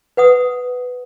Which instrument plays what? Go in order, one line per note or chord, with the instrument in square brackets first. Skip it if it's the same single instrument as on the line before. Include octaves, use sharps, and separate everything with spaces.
[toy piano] B4 F#5 D#6